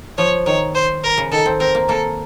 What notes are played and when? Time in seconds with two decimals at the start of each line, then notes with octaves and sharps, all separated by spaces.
0.18 F3 C#5
0.46 D#3 C#5
0.75 C5
1.04 A#4
1.18 C#3
1.32 D#3 A4
1.46 C4
1.60 C4 A#4
1.75 A#3
1.89 A#3 A4